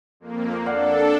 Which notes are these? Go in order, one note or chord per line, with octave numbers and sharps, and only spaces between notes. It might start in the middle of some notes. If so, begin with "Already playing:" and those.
F2 A#3
D4 A4 D5 F5 F#5